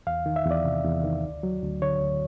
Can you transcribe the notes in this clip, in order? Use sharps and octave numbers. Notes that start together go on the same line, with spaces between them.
E2 F5
D#3
E5
E2
D5
C3
E2
D#3
D2
F#3
D2
D3 C#5
D2